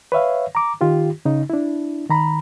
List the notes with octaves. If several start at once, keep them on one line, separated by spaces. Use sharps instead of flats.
B4 C#5 E5 F5
A#5 D6
D#3 F4 G4
C#3 D#4
D4 E4
D#3 A#5 B5